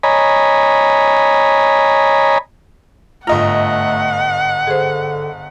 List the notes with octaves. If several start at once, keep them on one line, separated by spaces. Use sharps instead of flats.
C#5 D#5 G#5 A#5 B5
G1 G#2 A3 F4 D#5 F#5 A#5
D3 G#4 C5